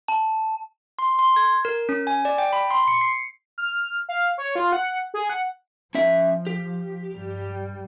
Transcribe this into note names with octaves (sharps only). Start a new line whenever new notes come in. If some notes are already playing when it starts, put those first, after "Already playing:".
A5
C6
C6
G#6
A#4
C#4
G#5
D5
G5
B5
C6
C#7
C7
F6
F5
C#5
F4
F#5
G#4
F#5
F3 C#4 E5
G4
G2 G3